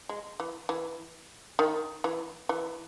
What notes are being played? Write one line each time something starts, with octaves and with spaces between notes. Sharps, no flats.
G#3
E3
E3
D#3
E3
E3